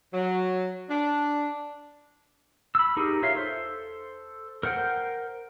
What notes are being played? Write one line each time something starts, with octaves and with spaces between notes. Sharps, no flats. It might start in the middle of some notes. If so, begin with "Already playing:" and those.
F#3
D4
B5 E6
D#4 G4 G#4 A#4
F4 C#5 E5 F5
A4 C5
A#4 C5 F#5 G5